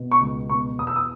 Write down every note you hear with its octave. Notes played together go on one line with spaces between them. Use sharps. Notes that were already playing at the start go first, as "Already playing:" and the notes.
Already playing: B2
C#6
C#2
B2 C#6
E2 D#6
E6
D#6